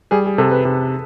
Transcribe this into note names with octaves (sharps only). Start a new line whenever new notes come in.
G3 G#4
G#4
C3 A4
B4
C3